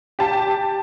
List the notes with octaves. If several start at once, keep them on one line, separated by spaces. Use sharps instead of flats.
G4 A5